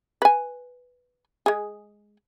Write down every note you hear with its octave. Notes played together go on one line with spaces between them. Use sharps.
B4 G#5
G#3 G#4